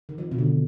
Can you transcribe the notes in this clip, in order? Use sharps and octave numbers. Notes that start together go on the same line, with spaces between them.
D#3
F3
B2
D3